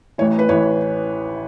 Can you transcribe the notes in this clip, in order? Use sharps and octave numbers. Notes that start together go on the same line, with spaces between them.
A1 A2 E3 C#5
B4
A1 A2 E3 C#5